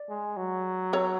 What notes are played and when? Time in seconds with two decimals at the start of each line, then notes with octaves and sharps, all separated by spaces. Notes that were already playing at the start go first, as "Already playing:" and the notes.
Already playing: D5
0.09 G#3
0.37 F#3
0.93 A4 C#5